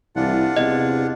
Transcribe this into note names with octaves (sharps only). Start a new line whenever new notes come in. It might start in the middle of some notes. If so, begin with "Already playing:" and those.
C2 E3 D4 F4 F#5
E2 C3 D#5